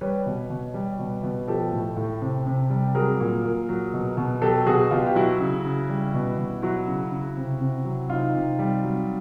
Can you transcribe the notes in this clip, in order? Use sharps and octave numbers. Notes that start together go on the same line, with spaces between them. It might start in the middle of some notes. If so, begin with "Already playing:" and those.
G3 B4 C#5
B2
B2
G3
B2
B2
F3 G4 A4
A2
A2
C3
C3
G3
F#3 G#4 A#4
A#2
A#2
F#3
B2
B2
F#3 G4 A4
B2 F#4 G#4
B2 F4 G4
G4
F#3 E4 F#4
C#3
C#3
G3
B2
B2
F#3 E4 F#4
C#3
C#3
C3
C3
F#3
C3 D#4 F4
C3
G3
F#3